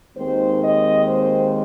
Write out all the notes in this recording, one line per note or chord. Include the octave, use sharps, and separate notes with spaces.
D#2 D#3 G#3 C4 C5
D#5
C5